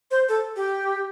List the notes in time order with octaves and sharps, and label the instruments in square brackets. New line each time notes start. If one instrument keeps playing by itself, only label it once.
[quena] C5
A4
G4